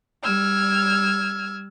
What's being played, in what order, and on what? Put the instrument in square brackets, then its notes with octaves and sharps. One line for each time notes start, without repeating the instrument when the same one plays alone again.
[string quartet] G3 E6 F6 G#6